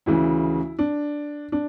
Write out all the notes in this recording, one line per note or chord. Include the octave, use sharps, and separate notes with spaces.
D2 C#3 E3 E4
D4
D4